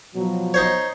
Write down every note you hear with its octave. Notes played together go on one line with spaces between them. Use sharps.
B2 F3 F#3
D#4 C5 C#5